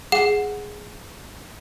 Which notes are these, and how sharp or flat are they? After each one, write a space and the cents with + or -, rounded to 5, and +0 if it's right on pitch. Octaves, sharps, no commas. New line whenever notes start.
G#4 +0 F#5 -10